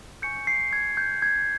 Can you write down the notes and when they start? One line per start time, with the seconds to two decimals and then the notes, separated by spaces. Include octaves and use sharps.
0.22 G#5 C#6 G6 C#7
0.47 C7
0.73 G#6
0.97 G6
1.22 G#6